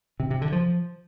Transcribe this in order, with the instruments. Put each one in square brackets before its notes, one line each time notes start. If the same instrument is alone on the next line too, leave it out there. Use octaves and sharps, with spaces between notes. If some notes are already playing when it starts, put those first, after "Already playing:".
[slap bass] C3
C3
D3
F3